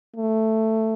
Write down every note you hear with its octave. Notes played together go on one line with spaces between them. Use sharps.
A3